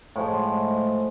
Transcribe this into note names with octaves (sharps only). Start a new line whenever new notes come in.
A2 F3 G#3